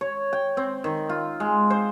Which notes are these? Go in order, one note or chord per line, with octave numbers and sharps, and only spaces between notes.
C#5
G5
C4
D#3
F4
G#3
C5